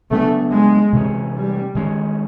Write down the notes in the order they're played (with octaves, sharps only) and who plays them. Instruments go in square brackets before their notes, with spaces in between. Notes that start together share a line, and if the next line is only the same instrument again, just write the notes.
[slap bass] C#3 F#3 B3 D4 [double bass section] A3
[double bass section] G#3
[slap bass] C3 E3 A3 C#4
[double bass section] G3
[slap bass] D#3 G#3 C#4